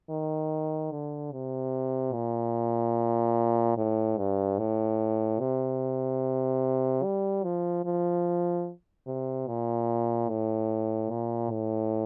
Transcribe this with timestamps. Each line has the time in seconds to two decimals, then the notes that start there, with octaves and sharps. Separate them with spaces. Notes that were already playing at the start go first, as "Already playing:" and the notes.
0.10 D#3
0.92 D3
1.32 C3
2.14 A#2
3.78 A2
4.18 G2
4.59 A2
5.40 C3
7.04 G3
7.44 F3
7.85 F3
9.07 C3
9.48 A#2
10.29 A2
11.11 A#2
11.51 A2